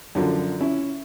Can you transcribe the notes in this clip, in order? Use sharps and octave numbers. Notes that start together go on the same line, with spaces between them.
F#2 D3 F3
C#4 E4